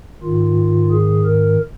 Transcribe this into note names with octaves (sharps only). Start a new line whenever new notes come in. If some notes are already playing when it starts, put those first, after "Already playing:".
G#2 D#3 F4
G#4
A#4